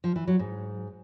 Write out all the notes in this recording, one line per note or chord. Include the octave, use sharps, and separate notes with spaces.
F3
E3
F#3
G#2